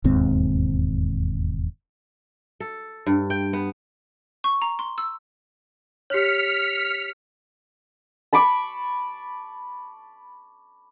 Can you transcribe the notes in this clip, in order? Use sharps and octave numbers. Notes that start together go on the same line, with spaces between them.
E1 D#2 G#2 C4
A4
G2
G5
B3
C#6
A#5
C6
E6
G4 C#5 F6 B6 C#7
A5 B5 C#6 D6